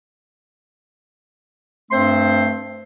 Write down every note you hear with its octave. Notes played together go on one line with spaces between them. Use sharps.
G2 A3 C4 C5 C6